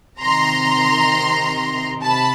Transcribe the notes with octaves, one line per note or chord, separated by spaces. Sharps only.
C3 D#3 A#5 C6
C3 A5 B5